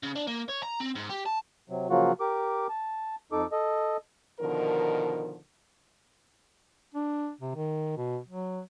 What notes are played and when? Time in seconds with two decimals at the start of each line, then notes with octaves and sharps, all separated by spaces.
0.03 C#3
0.16 D4
0.27 A#3
0.48 C#5
0.63 A#5
0.80 C4
0.96 G#2
1.10 G4
1.26 A5
1.69 C3 F#3
1.90 C#3 F3 F#3 A#3 F4 F#4
2.20 G4 A#4 D6
2.69 A5
3.32 F2 D#4 A4 D6
3.52 A4 D#5
4.40 B2 D3 D#3 F3 A#4
6.95 D4
7.41 C3
7.56 D#3
7.97 B2
8.28 F#3